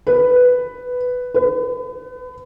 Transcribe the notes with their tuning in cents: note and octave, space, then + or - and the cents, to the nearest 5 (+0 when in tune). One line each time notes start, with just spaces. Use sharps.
B4 +10
B4 +35